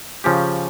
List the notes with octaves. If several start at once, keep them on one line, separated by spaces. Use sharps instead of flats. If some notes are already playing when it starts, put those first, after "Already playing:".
C#3 F3 C#4 G4